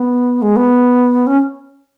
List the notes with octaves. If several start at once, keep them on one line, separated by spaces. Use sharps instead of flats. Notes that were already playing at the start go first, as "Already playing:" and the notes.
Already playing: B3
G#3
B3
C#4